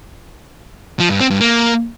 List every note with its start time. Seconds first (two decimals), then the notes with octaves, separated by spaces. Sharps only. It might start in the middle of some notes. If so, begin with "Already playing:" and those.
1.00 F3
1.10 G2
1.20 C4
1.30 G2
1.41 A#3